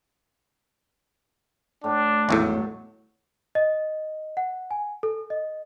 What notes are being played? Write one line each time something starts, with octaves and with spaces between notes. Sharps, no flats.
A2 D4
G#1 E2 A2 F#3 A3
D#5
F#5
G#5
A4
D#5